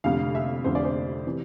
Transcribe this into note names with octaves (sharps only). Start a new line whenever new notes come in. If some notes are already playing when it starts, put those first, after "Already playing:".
F1 F2 D3 F5
E5
F1 F2 D3 C5
D5
C5
C3 E3